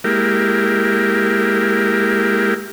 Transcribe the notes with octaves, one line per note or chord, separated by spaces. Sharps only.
G#3 A#3 E4 G4 A#4